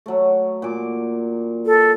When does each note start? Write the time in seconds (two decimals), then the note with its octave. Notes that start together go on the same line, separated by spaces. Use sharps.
0.06 F#3 A3
0.62 A#2 D6
1.66 A4